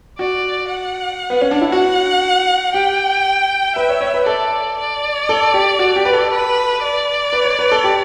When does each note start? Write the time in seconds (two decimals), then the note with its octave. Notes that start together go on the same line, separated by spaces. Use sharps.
0.19 F#4 D5
0.69 F#5
1.30 B3
1.41 C#4
1.51 D4
1.61 E4
1.71 F#4 F#5
2.73 G4 G5
3.76 B4 E5
3.89 C#5
4.01 C#5
4.14 B4
4.26 A4 D5
4.77 D5
5.29 A4
5.54 G4
5.79 F#4
5.96 G4
6.05 B4
6.13 A4
6.30 B4
6.82 D5
7.33 B4
7.45 C#5
7.59 B4
7.72 A4
7.84 G4